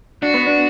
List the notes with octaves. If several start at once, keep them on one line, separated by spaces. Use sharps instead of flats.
D4 F#4
B3
D4